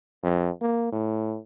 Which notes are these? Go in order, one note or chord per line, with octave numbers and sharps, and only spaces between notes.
F2
A#3
A2